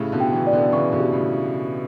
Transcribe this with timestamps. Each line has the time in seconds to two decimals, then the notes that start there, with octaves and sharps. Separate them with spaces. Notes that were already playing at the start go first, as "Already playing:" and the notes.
Already playing: A2 C#3 G4
0.12 B2 D3
0.20 G5
0.33 C#3 E3
0.47 D5
0.53 B2 D3
0.72 C#3 E3 C#6
0.92 B2 D3
1.00 G4
1.12 A2 C#3